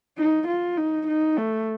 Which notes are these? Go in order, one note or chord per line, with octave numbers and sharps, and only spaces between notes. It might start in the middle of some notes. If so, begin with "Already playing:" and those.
D#4
F4
D#4
D#4
A3